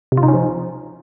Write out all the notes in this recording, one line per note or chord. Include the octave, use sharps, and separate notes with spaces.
C3
F4
D#4
C#4
F3